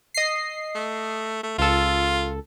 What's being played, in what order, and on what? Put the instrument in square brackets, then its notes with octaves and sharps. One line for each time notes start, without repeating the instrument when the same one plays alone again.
[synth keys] D#5 C7
[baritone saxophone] A3
A3
[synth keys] C#2 A4 [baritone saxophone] F4